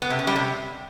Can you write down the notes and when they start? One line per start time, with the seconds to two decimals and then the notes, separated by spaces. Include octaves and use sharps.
0.02 B3
0.10 C3
0.19 C#4
0.27 G3
0.36 C3